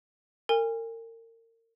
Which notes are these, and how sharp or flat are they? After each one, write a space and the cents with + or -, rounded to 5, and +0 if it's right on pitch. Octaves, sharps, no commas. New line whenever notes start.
A#4 -35 G#5 -35